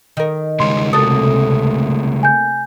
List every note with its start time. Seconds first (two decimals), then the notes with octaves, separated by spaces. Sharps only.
0.17 D#3 A#4
0.60 C#3 G3 G#3 C6
0.93 C3 A3 A#3 F#4 A4 D#6
2.23 G#5 G6